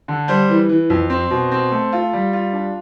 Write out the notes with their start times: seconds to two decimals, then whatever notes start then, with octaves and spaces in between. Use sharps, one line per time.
0.08 D3
0.28 G3 C5
0.49 E3
0.69 E3
0.90 F2
1.10 C4
1.31 B2
1.52 C4
1.72 A3
1.92 F4
2.13 G3
2.33 F4
2.53 D4